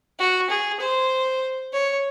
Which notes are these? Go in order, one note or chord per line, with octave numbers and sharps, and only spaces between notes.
F#4
G#4
C5
C#5